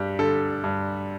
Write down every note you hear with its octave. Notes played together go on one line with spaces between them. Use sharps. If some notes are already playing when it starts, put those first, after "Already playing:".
Already playing: G2 G4
D3 A4
G2